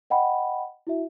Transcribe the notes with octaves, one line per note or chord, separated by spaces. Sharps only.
D#5 F#5 G5 B5
E4 F#4 E5